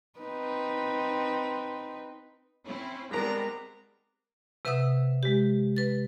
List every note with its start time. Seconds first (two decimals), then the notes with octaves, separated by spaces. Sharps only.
0.19 C4 D#4 B4
2.66 C4 C#4 E4
3.11 G3 G#3 B3 C4 D4 A#4 A#5 B6
4.65 C3 B4 E5 F#5 D#6 E6
5.23 G#3 G4
5.76 B4 A6